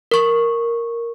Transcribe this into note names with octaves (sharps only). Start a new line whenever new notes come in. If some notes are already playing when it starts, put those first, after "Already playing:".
A#4 C#6